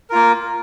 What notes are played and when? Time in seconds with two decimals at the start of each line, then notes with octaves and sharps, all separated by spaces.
0.10 A#4
0.12 F4
0.15 A#3